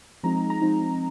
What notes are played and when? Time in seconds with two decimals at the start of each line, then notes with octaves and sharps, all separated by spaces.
0.23 F3 G#3 C4 D#4 A#5
0.50 A#5
0.62 F3 G#3 C4 D#4